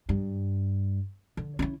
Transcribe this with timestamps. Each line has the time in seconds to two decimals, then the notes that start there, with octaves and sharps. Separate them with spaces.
0.09 G2
1.37 D3
1.59 C#4 E4